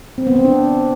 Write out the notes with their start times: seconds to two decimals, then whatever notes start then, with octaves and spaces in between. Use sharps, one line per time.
0.18 C4
0.27 B3
0.36 C4
0.45 D4